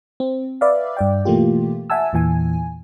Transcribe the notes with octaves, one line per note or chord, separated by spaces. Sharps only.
C4
B4 D5 E5 F5
G2 D5 G5
B2 E3 A3 A#3 F4 G4
E5 F#5 G#5 A5 E6
E2 A#2 E3 G#5